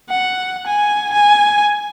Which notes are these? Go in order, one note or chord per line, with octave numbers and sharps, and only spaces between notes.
F#5
G#5
G#5